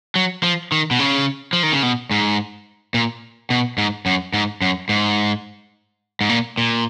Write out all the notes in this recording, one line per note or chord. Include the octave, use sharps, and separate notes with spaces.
F#3
F3
D#3
B2
C#3
F3
D#3
C#3
B2
G#2
A#2
B2
G#2
F#2
G#2
F#2
G#2
G#2
A#2
A#2